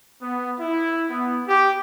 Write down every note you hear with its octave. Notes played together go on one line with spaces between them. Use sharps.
B3
E4
B3
G4